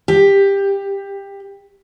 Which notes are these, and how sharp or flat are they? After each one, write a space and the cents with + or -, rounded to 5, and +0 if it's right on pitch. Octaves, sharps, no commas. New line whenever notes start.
G4 +15